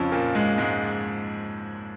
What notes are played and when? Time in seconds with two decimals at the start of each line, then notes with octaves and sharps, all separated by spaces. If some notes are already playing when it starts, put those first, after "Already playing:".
Already playing: F2 C#3 F3 C#4
0.12 A#2 A#3
0.35 G#2 G#3
0.58 G#2 G#3